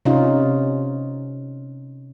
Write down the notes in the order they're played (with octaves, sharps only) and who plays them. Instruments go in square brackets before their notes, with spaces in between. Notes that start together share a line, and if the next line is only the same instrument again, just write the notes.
[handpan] C3 C#4 D#4 F4